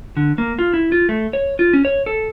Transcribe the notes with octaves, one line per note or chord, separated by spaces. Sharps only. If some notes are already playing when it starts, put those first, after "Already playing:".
D3
A#3
F4
E4
F4
A3
C#5
F4
C#4
C#5
A4